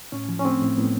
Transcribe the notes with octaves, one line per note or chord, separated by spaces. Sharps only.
A2 C#4
F3
C#4
A3 C4
A2
A2 B3